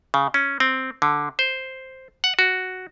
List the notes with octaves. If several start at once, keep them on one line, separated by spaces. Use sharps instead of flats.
C#3
C#4
C4
D3
C5
F#5
F#4